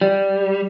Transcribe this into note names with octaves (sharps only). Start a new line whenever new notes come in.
G3